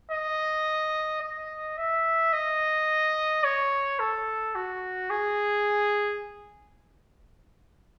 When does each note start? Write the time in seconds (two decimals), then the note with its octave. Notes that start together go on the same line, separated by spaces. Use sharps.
0.11 D#5
1.22 D#5
1.78 E5
2.33 D#5
3.44 C#5
3.99 A4
4.55 F#4
5.10 G#4